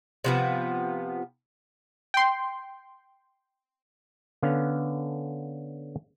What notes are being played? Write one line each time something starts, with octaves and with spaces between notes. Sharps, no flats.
C3 F3 B3
G5 C6
D3 B3 C#4 F5